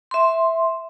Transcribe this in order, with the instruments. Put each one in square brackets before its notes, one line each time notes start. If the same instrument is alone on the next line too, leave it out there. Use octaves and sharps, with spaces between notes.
[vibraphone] E5 C6